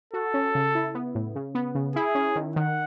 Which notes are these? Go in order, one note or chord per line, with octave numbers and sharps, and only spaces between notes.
F#4 A4
C#4
C#3
E4
B3
A2
C#3
B3
C#3
E4 G#4
C#4
D#3
D#3 F#5